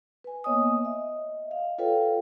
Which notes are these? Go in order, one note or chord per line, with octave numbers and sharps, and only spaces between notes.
B4 G#5
A#3 B3 C#5 D#5 G#5 D#6
D#5 E5
F5
F4 A4 B4 C#5 F5 G5